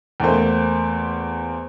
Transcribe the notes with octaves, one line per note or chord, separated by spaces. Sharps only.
E2 A3 A#3 C5